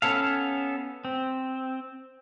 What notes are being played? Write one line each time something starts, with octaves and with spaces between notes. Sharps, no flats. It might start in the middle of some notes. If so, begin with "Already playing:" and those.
B3 C#4 A4 F5
C4